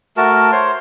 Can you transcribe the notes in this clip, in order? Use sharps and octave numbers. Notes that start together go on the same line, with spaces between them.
A3 F#4 A#4 A5
C5 C#5 C6